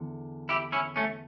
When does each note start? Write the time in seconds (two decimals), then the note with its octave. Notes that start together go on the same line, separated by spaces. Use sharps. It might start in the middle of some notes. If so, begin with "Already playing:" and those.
Already playing: E2 D3
0.49 E4 G4
0.72 C#4 E4
0.96 A3 C#4